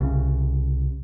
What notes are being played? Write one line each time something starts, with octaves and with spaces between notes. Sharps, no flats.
C2 C#3